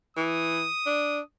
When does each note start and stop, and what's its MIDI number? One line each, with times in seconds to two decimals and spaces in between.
0.17 0.67 52
0.17 1.23 87
0.86 1.20 62